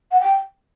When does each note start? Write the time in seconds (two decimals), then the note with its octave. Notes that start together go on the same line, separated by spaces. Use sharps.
0.12 F#5
0.20 G5